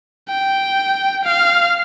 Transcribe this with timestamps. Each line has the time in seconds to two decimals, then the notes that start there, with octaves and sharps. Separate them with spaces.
0.30 G5
1.25 F5